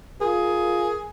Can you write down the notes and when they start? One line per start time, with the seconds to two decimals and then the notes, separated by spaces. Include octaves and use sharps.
0.21 F4 G#4 A#4